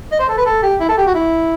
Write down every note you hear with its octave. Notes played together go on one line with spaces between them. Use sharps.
D#5
C5
A4
B4
A4
G4
E4
A4
G4
F#4
E4